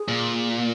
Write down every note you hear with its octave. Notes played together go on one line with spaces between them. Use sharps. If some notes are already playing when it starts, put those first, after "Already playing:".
Already playing: G#4
A#2